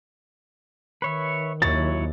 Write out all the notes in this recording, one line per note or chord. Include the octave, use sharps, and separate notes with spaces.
D#3 B4 C#5 E5
D#2 F#3 E4 C#5 A6